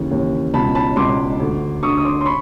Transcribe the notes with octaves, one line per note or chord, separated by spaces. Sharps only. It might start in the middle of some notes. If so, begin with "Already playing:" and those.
Already playing: D#2 C#3 E3
D#2 C#3 E3
C#2 B2 A5 B5
A5 B5
C#2 B2 C6 D6
D2 D3
D2 D3 C#6 D#6
D#6
C6 D6
C6
B5 C#6